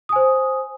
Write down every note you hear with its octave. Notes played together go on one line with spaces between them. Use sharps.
C5 G#5 D#6